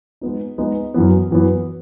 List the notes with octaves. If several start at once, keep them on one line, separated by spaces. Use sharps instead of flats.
G#3 B3 D#4
G#3 B3 D#4
F#2 E3 B3
F#2 E3 B3